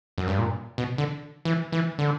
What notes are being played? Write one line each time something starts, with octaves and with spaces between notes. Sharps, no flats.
F#2
G2
A#2
B2
D3
E3
E3
D3